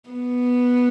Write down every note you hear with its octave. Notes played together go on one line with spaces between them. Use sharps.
B3